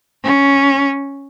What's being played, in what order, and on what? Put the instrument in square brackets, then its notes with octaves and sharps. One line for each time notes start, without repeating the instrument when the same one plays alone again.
[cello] C#4